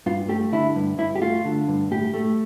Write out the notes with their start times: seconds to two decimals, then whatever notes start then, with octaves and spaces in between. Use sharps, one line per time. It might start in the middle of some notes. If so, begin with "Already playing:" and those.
0.06 G2 F4
0.29 A3 G4
0.52 D3 E4
0.76 G2
0.98 G2 E4
1.15 G4
1.21 A3 F4
1.45 D3
1.68 G2
1.91 A2 G4
2.14 A3